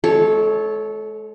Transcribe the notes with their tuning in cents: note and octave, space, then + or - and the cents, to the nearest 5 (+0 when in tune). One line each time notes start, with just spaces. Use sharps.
G#3 +35 A4 -20 C#5 +0